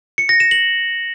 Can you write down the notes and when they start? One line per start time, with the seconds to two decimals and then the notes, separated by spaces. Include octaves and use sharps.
0.18 C#7
0.29 A#6
0.40 E7
0.51 F#7